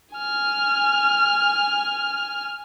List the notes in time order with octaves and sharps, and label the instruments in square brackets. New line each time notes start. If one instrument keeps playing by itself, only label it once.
[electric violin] G#5 F6